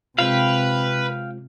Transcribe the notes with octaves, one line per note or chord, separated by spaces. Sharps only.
C3 G#3 C4 F4 B4 F5 G5